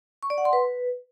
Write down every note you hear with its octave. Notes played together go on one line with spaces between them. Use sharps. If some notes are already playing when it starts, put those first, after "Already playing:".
C#6
D5
F#5
C6
B4